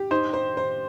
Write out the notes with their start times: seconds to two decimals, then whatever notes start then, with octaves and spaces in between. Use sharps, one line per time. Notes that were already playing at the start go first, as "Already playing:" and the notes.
Already playing: G4
0.11 D#4 C5
0.33 C5
0.57 C5